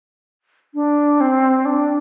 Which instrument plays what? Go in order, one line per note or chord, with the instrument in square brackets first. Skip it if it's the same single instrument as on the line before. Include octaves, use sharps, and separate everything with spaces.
[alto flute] D4
C4
D4